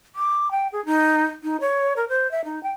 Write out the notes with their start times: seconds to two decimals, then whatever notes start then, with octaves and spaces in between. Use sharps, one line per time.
0.15 D6
0.51 G5
0.72 G#4
0.86 D#4
1.43 D#4
1.61 C#5
1.97 A#4
2.09 C5
2.31 E5
2.45 D#4
2.63 G5